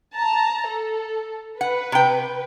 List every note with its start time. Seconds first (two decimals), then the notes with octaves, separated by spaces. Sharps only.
0.18 A5 A#5
0.69 A4
1.61 B4 F#5
1.92 C3 G5